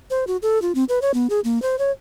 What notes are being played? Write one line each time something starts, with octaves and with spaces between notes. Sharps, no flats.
C5
F#4
A4
F4
C4
B4
C#5
B3
G#4
A#3
C5
C#5